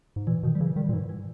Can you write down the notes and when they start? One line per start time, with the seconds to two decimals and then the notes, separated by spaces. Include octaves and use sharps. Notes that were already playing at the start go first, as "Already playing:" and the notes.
0.16 G#2
0.27 A#2 E3
0.43 B2 D#3
0.55 G3
0.60 C#3 E3
0.76 D#3 G3
0.89 A#2
0.93 G#2 E3
1.09 E3